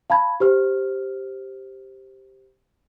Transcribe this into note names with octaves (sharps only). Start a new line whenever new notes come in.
F5 A5 B5 G#6
G4 C5 F6